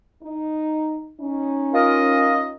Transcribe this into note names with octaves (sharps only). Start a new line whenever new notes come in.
D#4
C#4 D#4
F4 A#4 D#5